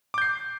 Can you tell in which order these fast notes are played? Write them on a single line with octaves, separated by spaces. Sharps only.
D6 G6 C7